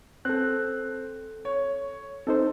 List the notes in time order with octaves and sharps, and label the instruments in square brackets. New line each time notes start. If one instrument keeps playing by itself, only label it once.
[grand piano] C4 [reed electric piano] A4 F#6
[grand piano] C#5
[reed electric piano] C4 D#4 C5 [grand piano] A4